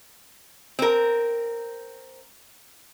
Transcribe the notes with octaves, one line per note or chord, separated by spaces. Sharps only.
C4 A#4